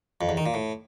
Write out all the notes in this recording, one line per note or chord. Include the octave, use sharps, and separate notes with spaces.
F2
E2
D#3
A#2
A2